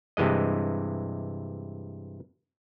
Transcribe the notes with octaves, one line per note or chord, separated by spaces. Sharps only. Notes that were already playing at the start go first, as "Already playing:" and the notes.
G2 C3 E3 G#3 D#5